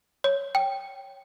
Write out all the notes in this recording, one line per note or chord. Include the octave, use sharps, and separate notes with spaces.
C#5
G5